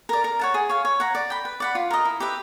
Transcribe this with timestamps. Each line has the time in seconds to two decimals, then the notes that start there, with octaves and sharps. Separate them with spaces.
0.09 A#4 D5
0.24 A#4
0.39 C#5 F#5 A5
0.54 G#4
0.69 C#5 F5
0.85 C#5
1.00 F#5 A#5
1.15 D5
1.30 G5 B5
1.45 B4
1.60 D5 F#5 B5
1.75 F4
1.91 A#4 D#5
2.05 E4
2.20 G4 B4 E5